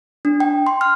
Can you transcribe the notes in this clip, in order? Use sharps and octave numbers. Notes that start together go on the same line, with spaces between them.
D4
G5
C6
F6